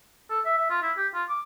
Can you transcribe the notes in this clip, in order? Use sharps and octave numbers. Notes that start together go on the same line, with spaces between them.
A4
E5
E5
F4
E4
G4
F4
D6